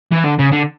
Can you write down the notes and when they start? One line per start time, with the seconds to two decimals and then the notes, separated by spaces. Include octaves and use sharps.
0.12 E3
0.24 D3
0.39 C#3
0.52 D3